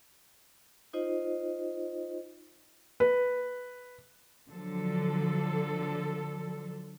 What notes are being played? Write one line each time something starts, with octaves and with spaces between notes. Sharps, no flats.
D#4 F4 C5 D#5
B4
D3 F3 F#3 A4